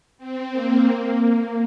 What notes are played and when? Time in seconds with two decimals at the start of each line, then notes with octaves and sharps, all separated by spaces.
0.18 C4
0.52 A#3
0.86 A#3
1.19 A#3